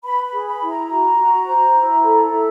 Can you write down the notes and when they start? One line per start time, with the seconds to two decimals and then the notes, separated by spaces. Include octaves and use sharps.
0.04 B4 B5
0.25 B5
0.32 G#4
0.47 B5
0.61 E4
0.68 A#5
0.89 F#4
1.18 F#4
1.46 C5
1.75 E4
2.03 A4
2.31 E4